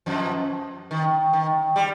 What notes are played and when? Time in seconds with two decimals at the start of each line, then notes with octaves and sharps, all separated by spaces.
0.06 F2 F3
0.91 D#3
1.33 D#3
1.76 G3